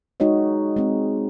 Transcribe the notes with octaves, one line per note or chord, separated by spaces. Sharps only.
G#3 D#4 F#4 C#5 D#5
G#3 C4